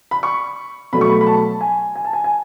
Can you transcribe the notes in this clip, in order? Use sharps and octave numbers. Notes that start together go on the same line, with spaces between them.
B5
C#6
B2 F#3 A3 B5
C#6
B5
B5
A5
G#5
G#5
A5
G#5
G#5